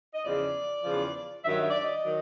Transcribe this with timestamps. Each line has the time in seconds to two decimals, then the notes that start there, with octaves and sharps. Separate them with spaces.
0.14 D#5
0.24 E2 C#3 F3 D5
0.84 E2 C#3 F3
1.44 G2 D#3 F#3 E5
1.57 D#5
1.70 D5
1.83 D#5
2.04 D#3 F#3